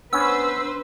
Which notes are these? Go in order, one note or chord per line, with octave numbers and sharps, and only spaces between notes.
B3 C#4 D4 B4 C5 E6